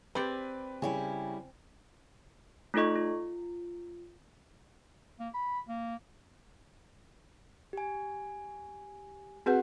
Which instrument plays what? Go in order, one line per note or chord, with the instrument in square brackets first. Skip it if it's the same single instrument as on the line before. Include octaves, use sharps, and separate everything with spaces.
[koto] C4 D5 [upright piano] G4 B4
[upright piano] C#3 C#5 [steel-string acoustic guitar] G3 E4 G4 [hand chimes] G5 G#5
[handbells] A3 D#4 F4 A4 D#5 C#6
F4
[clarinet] A#3
B5
A#3
[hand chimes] G4 G#5
[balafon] C4 G#4 B4 [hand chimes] F#4 F#5